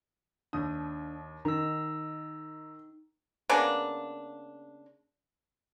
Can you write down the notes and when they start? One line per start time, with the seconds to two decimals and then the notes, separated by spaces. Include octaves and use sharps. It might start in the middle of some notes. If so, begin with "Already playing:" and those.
0.53 D#2 D4 D#6
1.45 D#3 D#4 A#5 E6
3.49 C#3 A#3 B3 D4